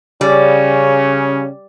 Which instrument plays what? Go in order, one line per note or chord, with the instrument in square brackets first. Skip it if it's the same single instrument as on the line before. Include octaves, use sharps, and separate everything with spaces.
[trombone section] C#3 C#4 [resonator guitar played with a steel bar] G3